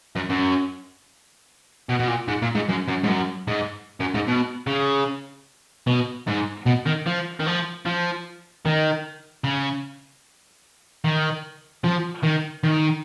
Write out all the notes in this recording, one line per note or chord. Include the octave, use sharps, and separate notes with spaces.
F#2
F#2
B2
B2
A#2
G#2
A#2
G#2
F#2
F#2
G#2
F#2
G#2
F#2
G#2
B2
C#3
B2
G#2
B2
D#3
F3
D#3
F3
F3
D#3
C#3
D#3
F3
D#3
D#3